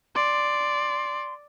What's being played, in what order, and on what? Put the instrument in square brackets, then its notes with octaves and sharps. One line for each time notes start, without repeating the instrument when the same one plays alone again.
[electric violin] D5 [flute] C6